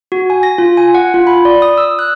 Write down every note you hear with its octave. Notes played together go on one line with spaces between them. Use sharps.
F#4
G#5
A#6
F4
G#5
F#5
F4
B5
D5
D#6
E6
F#6